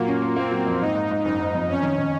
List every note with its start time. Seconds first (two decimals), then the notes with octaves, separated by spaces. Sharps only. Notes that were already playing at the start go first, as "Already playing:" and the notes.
Already playing: A#2 F#3 A#3
0.08 C#4
0.22 A#2
0.36 A#3 C4
0.51 F#3
0.66 F2
0.81 G#2 D#4
0.95 G#2
1.11 G#2
1.25 F#1 D#4
1.40 F#1
1.55 F2
1.68 F2 C#4
1.83 D#3
1.98 D#3